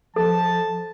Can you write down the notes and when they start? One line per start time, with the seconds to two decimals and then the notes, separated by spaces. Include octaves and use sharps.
0.16 F3 A4 A5